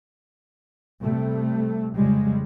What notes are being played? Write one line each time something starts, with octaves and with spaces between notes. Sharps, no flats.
C3 G3 A3
F2 C#3 G3 G#3